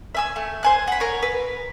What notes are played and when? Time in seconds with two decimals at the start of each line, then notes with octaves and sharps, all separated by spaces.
0.15 E5 G#5 E6
0.36 A3
0.63 C5 G#5 F#6
0.88 F#5 B5
1.00 A#4 C#5
1.22 B4